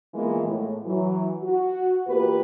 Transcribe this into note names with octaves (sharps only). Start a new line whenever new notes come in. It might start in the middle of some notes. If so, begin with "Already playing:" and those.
E3 F3 G#3 A#3 B3
A2
E3 F#3
F#4
E2 A#3 F4 G4 B4